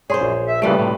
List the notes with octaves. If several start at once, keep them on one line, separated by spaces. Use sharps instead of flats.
F#2 G#4 C5 C#5 C6
A#1
E5
A#2 C#3 E3 G3 A3 B4 D7
D2 A2 C3